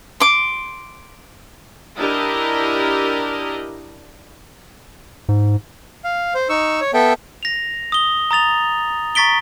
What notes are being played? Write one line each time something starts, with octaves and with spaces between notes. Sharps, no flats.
C6 D6
D4 E4 G4 A#4 D#5
G#2
F5
C5
D#4 C#6 E6
C#5
B3 A4 E5 G5
A#6 F7
D#6 G7
A#5 D#6 A6 F7
A#5 C#6 A6 B6 D7 G7